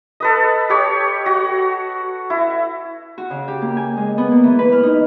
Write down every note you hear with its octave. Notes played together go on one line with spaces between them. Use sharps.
A4 B4 D#5
G4 C#5
F#4
E4
F#4
C#3
G4
A#3
G#5
G#3
B3
A#3
E3
B4
F6
D#4